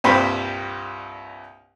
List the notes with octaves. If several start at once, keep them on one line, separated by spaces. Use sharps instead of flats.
C2 G2 A#2 C5 G5 B5